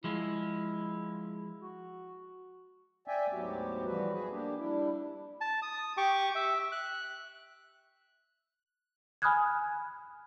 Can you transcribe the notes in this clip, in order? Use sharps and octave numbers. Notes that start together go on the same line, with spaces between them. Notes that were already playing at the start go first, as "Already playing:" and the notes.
F3 G#3 E4
F#4
D5 E5 G5 G#5
D2 G#2 F#3 B3 F#4 G4
E3 F3 G3 F#4 B4
F#4 G#4 B4
A#3 D4 G4
G3 D4 E4
A5
D#6
G4 C#6 D6
E5
F#6
G#5 B5 D#6 F6 F#6 G#6